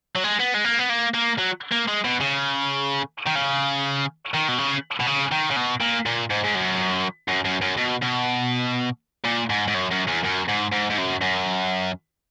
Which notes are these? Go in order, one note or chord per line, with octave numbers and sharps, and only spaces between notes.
F#3
G#3
B3
G#3
A#3
B3
A#3
A#3
F#3
A#3
G#3
B2
C#3
D#3
C#3
D#3
B2
C#3
B2
C#3
D#3
C#3
B2
A#2
A#2
G#2
G#2
F#2
F#2
F#2
F#2
B2
B2
A#2
G#2
G#2
F#2
F#2
E2
F#2
G#2
G#2
G#2
F#2
F#2